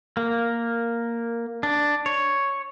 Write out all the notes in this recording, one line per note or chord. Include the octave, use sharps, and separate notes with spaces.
A#3
D4
C#5